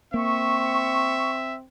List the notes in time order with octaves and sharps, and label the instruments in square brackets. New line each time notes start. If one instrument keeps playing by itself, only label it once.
[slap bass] A#3 [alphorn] C4 [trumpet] E5 [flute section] C#6